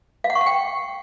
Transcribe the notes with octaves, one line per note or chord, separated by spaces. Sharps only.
F5
F#5
C#6
F#5
G5